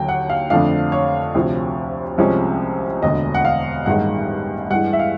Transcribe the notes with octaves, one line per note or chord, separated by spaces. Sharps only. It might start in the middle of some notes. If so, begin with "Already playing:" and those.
Already playing: D#2 D3 F#3 G5
F#5
F5
F2 D3 F3 A3 D4 F5
C#5
D2 C3 F3
C2 C3 F3 G#3 C#4
E1 D2 D3 D#5
F#5
F5
A1 G2 D#3 G#3 F#5
G2 E3 G#3 F#5
E5
F5